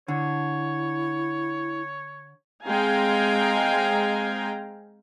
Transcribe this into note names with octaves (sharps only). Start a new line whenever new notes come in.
D3 E4 C#5
G#3 C4 F5 G5 G#5 A#5